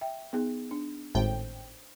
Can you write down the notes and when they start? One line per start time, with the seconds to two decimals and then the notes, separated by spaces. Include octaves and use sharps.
0.01 E5 G5
0.33 B3 D#4 G#4
0.71 D4
1.15 G#1 A2 C5 G5